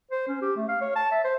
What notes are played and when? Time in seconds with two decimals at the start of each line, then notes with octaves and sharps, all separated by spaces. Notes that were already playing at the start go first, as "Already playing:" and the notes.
0.11 C5
0.28 C#4
0.42 G4
0.56 A3
0.68 F5
0.81 C#5
0.96 A5
1.11 E5
1.25 C5